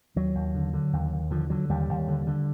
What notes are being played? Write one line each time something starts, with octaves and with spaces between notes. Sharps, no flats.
D#2 F#3
D#2
D3
D3
D#2
D#2
D3 F3
D3 F#3
D#2 G3
D#2
D3
D3